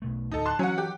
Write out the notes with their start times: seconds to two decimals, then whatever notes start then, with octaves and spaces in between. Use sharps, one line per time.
0.02 B1 B2 A3
0.31 D2 A2 D#4 A4
0.45 A5 C6 F#6
0.59 E3 F#3 C#4 F#5
0.78 G4